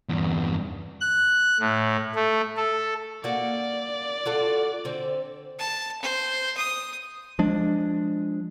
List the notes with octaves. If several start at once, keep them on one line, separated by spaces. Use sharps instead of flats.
E2 G2
F#6
A2
A3
A4
A#3 F#4 D5
F4 F#4 A4
D3 C4
A5
C5
D#6
F3 G#3 D4